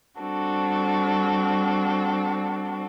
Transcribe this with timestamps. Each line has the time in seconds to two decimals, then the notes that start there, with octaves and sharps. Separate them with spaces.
0.21 G3 C4 D4 F#4 A4